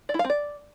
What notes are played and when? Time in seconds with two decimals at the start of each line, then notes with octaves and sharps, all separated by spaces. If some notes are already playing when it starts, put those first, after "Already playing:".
0.09 D5
0.14 E4
0.19 F5
0.24 C4
0.30 D5